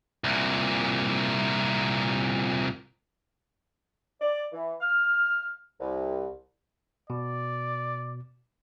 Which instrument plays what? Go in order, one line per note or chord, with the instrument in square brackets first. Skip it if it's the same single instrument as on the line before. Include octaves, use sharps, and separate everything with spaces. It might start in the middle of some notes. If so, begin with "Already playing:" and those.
[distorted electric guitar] C2 A#2
[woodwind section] D5
E3
F6
C2
[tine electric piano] B2 [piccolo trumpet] D5